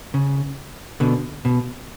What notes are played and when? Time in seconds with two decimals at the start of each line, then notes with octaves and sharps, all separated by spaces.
0.14 C#3
1.00 B2 D3
1.45 B2